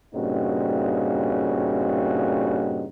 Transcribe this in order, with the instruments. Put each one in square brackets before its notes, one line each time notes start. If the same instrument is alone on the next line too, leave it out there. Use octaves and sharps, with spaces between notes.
[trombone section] G2 A#2 C#3 C4 D#4 F#4